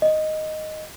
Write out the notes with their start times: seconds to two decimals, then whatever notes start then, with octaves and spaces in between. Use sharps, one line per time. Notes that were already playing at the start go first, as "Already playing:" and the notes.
0.02 D#5